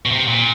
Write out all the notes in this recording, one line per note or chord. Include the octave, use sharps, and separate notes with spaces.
B2
C3
A#2